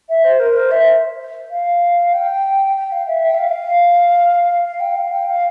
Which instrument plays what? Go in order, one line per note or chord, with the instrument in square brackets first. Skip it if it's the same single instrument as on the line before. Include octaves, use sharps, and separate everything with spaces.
[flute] E5
C5
A#4
C5
E5
F5
G5
G5
F5
E5
G5
E5
F5
F5
G5
F5
G5
F5